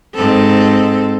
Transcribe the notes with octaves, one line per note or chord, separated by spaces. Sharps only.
G#2 C4 A4